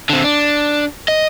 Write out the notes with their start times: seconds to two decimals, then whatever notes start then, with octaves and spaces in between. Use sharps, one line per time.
0.10 D3 C4
0.24 D4
1.08 D#5